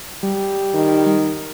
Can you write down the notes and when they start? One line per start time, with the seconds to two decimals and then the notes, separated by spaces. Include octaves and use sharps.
0.23 G3
0.74 D#3